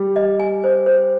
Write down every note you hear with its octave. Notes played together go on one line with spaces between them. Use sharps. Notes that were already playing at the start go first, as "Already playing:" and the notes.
Already playing: G3
D#5
G#5
C5
C5